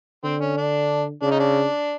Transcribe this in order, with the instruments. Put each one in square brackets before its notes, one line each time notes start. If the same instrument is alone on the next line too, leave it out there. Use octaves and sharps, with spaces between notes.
[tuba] D3 [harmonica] C4
[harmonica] C#4
D4
[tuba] C#3 [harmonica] D4
[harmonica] D#4
D4